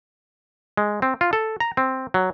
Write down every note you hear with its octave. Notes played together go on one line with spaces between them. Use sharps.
G#3
C4
F4
A4
A#5
C4
F#3